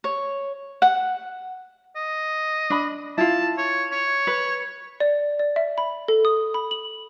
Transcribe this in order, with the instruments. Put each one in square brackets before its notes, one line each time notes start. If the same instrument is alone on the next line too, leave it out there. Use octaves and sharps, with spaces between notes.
[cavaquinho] C#5
F#5
[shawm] D#5
[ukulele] D4 B5
[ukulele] E4 F4 [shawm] A5
[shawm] C#5
C#5
[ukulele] B4
[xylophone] D5
D5
E5
B5
A4
D#6
B5
F#7